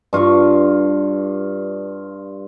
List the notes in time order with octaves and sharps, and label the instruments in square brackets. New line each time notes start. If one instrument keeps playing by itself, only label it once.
[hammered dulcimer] G2 F4 F5 C#6